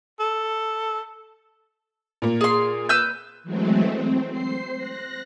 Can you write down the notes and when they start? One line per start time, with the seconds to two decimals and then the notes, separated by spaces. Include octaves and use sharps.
0.20 A4
2.22 A#2 A#3
2.41 G#4 C6
2.89 B4 E6 G6
3.44 E3 F#3 G#3 A3 C4
3.95 C4
4.29 C5 C7
4.76 F#6 A#6